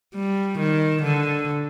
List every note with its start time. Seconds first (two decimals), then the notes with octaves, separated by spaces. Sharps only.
0.15 G3
0.59 D#3
1.03 D3